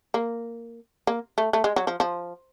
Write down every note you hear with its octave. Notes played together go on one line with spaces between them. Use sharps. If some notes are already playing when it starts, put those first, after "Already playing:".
A#3
A#3
A3
A3
G#3
F#3
F3
F3